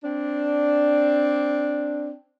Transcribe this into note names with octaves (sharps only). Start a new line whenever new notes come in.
C4 D4